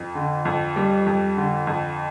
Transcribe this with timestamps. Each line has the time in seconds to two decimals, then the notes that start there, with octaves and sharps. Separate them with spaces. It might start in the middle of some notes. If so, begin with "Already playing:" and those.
Already playing: F2
0.15 D3
0.45 F2
0.76 G3
1.06 F2
1.37 D3
1.67 F2